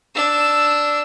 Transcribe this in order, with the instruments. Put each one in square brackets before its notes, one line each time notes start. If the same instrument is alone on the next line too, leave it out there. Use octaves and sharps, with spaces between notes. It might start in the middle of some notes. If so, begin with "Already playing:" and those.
[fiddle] D4 E6